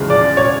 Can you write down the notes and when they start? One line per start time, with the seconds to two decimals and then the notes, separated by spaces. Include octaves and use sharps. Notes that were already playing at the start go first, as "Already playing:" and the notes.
Already playing: E2 C#3 F3 G#3
0.10 D5
0.37 C#5